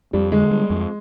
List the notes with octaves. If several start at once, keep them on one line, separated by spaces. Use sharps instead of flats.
F2 G3
D3 G#3
G3
F2